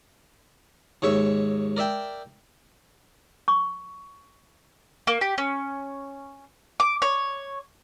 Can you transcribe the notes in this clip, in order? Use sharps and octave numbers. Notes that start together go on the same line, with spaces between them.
D#2 G#2 C#5 E5 C#6
A#4 D5 E5 G5
C#6
A#3
G4
C#4
D6
C#5